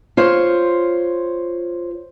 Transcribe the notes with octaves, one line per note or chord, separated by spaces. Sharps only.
F4 C5 C#5